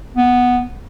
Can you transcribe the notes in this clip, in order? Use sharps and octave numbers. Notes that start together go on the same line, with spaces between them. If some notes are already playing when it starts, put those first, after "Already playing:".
B3